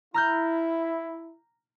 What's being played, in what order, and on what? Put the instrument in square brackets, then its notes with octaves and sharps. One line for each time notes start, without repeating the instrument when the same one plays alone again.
[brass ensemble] E4 [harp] A#5 F6 G6